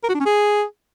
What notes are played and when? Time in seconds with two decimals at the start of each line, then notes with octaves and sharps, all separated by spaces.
0.04 A#4
0.09 F#4
0.15 D4
0.20 C#4
0.26 G#4